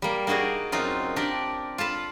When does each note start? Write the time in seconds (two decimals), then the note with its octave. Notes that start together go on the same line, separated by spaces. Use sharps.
0.02 G3 A#3
0.27 A#3 D#4 F#4 G#4 D5
0.72 F#2 C4 D#4 F4
1.16 D4 G4 A#4 D5 G5
1.78 F4 A4 A5 B5